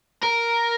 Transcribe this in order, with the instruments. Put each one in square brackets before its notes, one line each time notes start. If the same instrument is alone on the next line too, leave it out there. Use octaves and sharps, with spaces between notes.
[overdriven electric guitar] A#4